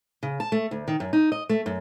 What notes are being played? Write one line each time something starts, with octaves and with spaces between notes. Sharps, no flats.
C#3
A5
A3
D2
D#3
F#2
D#4
D#5
A3
F#2